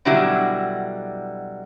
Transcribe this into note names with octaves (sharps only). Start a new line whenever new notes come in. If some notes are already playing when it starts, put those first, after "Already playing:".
B2 D3 F#3 G3 E4 F#4